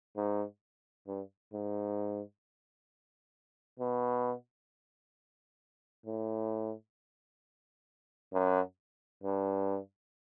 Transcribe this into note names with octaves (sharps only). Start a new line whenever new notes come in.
G#2
G2
G#2
B2
A2
F#2
G2